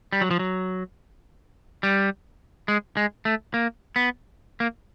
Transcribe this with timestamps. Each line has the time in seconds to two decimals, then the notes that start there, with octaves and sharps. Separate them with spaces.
0.13 G3
0.21 F#3
0.31 F3
0.39 F#3
1.83 G3
2.68 G#3
2.97 G#3
3.25 A3
3.54 A#3
3.96 B3
4.60 A#3